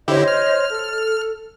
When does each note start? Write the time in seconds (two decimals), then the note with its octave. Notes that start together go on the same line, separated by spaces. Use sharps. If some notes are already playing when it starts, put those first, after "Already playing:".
0.08 D3 E4 G4 C5 C#5 D#5
0.28 F6
0.68 A4